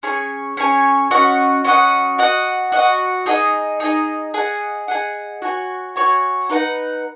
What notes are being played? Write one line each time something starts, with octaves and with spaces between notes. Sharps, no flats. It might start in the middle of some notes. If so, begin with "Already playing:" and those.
C#4 G#4 C#5 G#5
C#4 G#4 C#5 G#5
C#4 F#4 D#5 F#5
C#4 F#4 D#5 F#5
F#4 D#5 F#5
F#4 D#5 F#5
D#4 G#4 D#5
D#4 G#4 D#5
G#4 D#5 F#5
G#4 D#5 F#5
F#4 C#5 G#5
F#4 C#5 G#5
D#4 B4 F#5